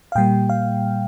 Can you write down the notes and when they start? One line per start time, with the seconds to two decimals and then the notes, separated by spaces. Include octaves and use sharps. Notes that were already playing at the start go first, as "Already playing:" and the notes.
0.12 F5
0.15 A#2 G3 A#3 G5
0.49 F5